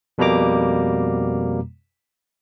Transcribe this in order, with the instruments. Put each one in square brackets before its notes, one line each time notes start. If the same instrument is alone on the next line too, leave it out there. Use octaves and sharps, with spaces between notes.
[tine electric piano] F2 B2 G3 A#3 A#5 D6